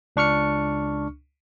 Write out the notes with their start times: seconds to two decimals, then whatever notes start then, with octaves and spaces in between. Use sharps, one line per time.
0.16 C#2 D4 C#6 F6 C#7